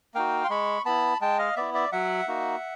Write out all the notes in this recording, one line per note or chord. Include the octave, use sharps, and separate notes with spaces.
A#3 D#4 F#4 F5 G5
C6
G#3 B5 C#6
B3 E4 A5 B5
G#3 G5 A5
D#5 F5
B3 E4 D5 E5
D5 E5
F#3 E5 F#5
A#3 D#4 F#4